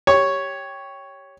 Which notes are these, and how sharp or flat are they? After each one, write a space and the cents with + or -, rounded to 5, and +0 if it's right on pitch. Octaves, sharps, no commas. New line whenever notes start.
G4 +0 C#5 +0 C#6 +0